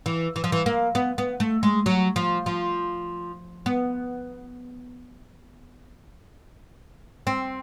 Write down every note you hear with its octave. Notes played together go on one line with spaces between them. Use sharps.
E3
E3
F3
E3
A#3
B3
B3
A3
G#3
F#3
F3
F3
B3
C4